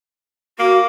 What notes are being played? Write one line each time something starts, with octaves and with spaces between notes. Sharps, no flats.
A#3 F#4